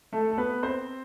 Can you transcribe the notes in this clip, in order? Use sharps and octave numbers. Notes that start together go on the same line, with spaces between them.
A3 A4
A4
B3 B4
C4 C5